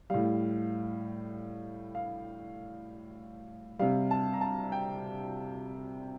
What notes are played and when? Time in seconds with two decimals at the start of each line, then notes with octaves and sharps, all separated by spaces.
0.10 A2 G3 F5
1.95 F5
3.79 C3 G3 F5
4.11 A5
4.33 A#5
4.41 A5
4.72 G5